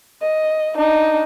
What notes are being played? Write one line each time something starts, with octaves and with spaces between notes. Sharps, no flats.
D#5
D4 D#4